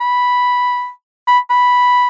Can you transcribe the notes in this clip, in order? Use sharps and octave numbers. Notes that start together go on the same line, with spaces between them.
B5
B5
B5